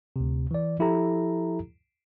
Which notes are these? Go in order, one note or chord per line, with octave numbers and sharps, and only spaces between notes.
D2 C3
E3 D5
F3 E4 G4 A4 A#5